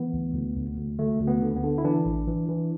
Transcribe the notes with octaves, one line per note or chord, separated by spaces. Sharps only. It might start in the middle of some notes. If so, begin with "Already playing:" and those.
Already playing: E3 B3
D2
D2
D2
D2
D2 A3
D2
B3
D3
B3
D3
E4
E3 D4
A1
E3
E3